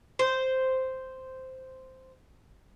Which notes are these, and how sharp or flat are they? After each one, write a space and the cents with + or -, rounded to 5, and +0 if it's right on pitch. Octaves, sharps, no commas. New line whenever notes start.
C5 -5